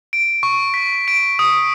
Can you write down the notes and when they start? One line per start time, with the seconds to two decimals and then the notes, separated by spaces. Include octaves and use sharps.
0.13 D7
0.43 C#6
0.74 B6
1.08 D7
1.39 D#6